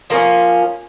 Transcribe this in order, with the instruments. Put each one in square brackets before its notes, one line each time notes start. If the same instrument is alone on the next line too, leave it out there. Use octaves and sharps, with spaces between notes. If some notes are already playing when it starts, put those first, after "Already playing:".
[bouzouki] F3 A#3 C#4